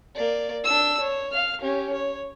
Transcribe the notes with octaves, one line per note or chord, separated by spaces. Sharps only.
A#3 D5
D4 E6
C#5
F5 F6
C#4 G4
C#5